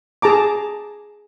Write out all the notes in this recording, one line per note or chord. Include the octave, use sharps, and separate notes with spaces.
G#4 A5 A#5 D6